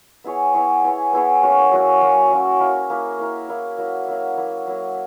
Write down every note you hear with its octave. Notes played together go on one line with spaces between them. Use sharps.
B3 E4 G#4 C#5
B3 E4 G#4 C#5
B3 E4 G#4 C#5
B3 E4 G#4 C#5
F#3 A#3 C#4 F#4
F#3 A#3 C#4 F#4
F#3 A#3 C#4 F#4
F#3 A#3 C#4 F#4
A#3 E4 A#4
A#3 E4 A#4
A#3 E4 A#4
A#3 E4 A#4
F#3 A#3 E4
F#3 A#3 E4
F#3 A#3 E4
F#3 A#3 E4